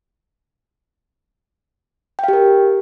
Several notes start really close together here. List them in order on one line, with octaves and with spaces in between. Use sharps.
G5 F5 G4 A#4